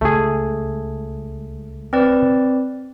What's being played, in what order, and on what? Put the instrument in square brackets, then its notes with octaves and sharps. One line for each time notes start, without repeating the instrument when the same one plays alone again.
[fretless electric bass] C#2 [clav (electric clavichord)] A3 G#4
[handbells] C4 B4 D5